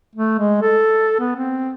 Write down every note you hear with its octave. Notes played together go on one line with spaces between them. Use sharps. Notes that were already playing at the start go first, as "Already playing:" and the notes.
A3
G#3
A4
B3
C4